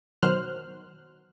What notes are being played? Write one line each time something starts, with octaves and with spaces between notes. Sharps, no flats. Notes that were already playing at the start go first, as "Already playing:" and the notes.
B2 D#3 F#3 C5 F6 F#6